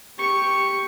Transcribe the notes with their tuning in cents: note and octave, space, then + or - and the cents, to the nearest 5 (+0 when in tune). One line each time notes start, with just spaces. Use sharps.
G4 +0 C#6 +0